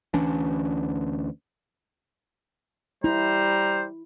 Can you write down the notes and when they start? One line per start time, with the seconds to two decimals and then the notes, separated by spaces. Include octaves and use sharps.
0.14 D2 E3 C#4 D4
3.04 G3 E4 C5 A#5